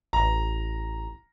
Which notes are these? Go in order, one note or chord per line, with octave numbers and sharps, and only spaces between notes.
A1 A#5